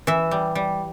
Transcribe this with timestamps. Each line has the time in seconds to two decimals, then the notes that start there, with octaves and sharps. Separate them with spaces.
0.07 E3 E5
0.31 G3
0.55 G3